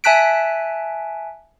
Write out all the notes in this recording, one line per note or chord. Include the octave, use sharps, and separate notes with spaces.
E5 G#5 A5 F#6 B6 D7